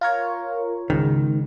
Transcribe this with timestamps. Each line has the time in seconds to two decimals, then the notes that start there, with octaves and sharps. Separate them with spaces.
0.01 F4 A#4 C#5
0.90 C#2 G#2 D#3